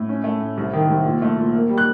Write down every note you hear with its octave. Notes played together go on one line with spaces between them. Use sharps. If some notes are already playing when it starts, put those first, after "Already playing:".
Already playing: A2
C#4
A3
A2
C2
D#3
C2
A#2
A3
A#2
A#3
G3
F#6